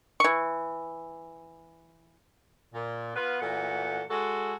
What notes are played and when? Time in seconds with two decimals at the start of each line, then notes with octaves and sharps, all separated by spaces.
0.20 E3 C#6
2.74 A#2
3.15 B3 F4 B4
3.41 A#2 E3 A3 F#4 A4 F#5
4.10 G#3 F#4 A4